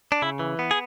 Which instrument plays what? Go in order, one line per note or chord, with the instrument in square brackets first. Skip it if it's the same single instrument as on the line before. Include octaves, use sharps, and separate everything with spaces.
[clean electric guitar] D4
C#3 E4
E3
B3
G#4